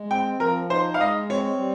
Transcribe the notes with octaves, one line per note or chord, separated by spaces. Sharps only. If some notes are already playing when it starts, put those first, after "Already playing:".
Already playing: G#3
C4 G5
F3 A#4
D#4 C5
F5
G#3 D#5
C4 C#5
G3